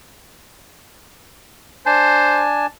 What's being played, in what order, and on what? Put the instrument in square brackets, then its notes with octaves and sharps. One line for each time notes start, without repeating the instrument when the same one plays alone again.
[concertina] D4 G#5 A5 [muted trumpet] C5